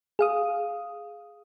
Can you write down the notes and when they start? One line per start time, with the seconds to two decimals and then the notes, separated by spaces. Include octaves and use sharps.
0.19 G#4 F5 D#6